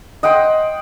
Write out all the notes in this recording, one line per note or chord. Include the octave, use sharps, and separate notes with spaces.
D#5 F#5 G5 C6